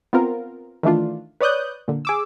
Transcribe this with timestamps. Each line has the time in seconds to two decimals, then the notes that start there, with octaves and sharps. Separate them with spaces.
0.13 B3 C4 F4 A#4
0.83 D#3 E3 A3 D4 F4
1.41 B4 C#5 D5 D#6 F#6 G6
1.88 A#2 D3
2.05 G#4 D6 E6